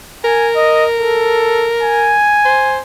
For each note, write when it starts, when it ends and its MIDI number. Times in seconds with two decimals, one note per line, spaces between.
0.25 2.16 70
0.25 0.50 80
0.56 0.85 75
0.97 1.71 69
1.83 2.83 80
2.45 2.80 72